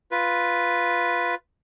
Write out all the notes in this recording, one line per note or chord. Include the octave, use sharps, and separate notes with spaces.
F4 B4